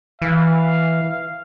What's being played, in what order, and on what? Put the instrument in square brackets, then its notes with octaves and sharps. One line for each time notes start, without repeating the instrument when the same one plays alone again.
[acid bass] E3 [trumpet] F5